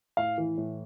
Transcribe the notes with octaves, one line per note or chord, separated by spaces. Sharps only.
A2 F5
E3
A2